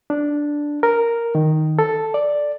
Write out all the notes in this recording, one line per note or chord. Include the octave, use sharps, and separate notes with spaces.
D4
A#4
D#3
A4
D5